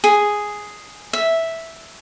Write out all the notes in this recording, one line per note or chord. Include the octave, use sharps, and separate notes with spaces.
G#4
E5